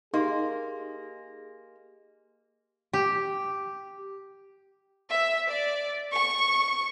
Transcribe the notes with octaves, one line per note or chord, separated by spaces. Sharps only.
A#3 D#4 G4 G#4 D#5 C6
G4
E5
D5
C#6